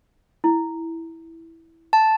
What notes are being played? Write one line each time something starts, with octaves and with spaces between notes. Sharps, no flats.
E4
A5